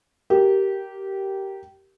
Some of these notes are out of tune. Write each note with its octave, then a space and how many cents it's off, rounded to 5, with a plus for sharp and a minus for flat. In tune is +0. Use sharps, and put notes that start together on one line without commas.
G4 -15 A#4 -5